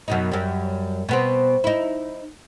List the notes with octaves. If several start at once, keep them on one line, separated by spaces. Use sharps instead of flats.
F#2 B2 D#4
F#2 G3
B2 B3 C4
D#4 E4